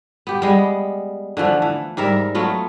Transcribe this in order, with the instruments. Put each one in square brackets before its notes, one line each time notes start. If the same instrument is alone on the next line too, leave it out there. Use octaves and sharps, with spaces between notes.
[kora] B3 G4
G3 G#3 B3
D3 E3 F3 A3
E3
G#2 G3 A#4 E5
F#3 A3 B3 F4